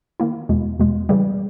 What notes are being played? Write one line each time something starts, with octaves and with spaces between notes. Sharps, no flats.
D#3 A#3 E4
E2 B2 G#3
E2 B2 G#3
C#3 E3 G3